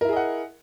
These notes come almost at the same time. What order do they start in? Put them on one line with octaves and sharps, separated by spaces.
A#4 E4 G#4 D#5 F#5